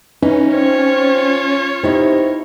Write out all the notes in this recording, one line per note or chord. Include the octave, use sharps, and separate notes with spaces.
E3 C#4 D#4
C4 F4 C#5
C3 B3 D#4 E4